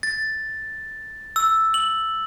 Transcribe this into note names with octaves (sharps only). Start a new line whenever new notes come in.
A6
E6
F#7